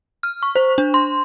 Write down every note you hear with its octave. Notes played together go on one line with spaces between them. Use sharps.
F6
C#6
C5
D4
C6